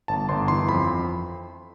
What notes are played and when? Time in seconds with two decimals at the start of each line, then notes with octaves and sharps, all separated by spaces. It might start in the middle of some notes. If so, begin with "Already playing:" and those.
0.08 G1 A5
0.29 G1 C6
0.48 E3 C6
0.68 F2 B5